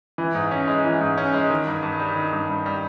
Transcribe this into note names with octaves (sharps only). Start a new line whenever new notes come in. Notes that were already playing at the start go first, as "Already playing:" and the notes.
E3
G#2
C#4
G#3
E3
G#2
C#4
G#3
D#3
G2
G2
G3
D#3
G2
G2
G3